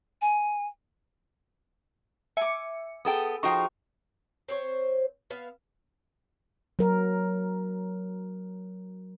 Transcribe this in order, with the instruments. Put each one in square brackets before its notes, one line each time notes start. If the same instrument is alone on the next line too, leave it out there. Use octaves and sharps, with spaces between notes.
[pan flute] G#5
[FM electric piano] E5 C#7 [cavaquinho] G#5 D6
[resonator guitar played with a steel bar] B3 A4 G5 [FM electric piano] G#4 D#6
[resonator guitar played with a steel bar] F3 D#4 [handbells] F#4 C#6 [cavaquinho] C5 G5 C6
[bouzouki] C4 C5 C#5
B3 E5 F5
[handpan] F#3 A#4